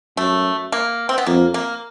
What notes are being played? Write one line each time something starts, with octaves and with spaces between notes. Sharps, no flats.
F#2 A3
A#3
C4
B3
F2 A#3
A#3